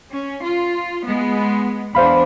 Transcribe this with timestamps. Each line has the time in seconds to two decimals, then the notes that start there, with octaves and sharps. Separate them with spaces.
0.10 C#4
0.44 F4
1.05 G#3 B3
1.95 E2 D4 C5 F5 B5